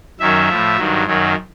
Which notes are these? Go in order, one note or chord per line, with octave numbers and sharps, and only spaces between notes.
F#2 D#3 F#3 E5
A2 F3
G2 D#3 F#3
F#2 D#3 F#3